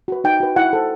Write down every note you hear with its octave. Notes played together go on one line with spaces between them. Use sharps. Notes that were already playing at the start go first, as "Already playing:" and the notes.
F#4 B4
D#4 G5
F#4 B4
E4 F#5
A4 C5